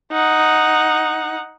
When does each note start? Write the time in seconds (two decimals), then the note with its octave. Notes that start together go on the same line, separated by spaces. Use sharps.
0.12 D#4 F#5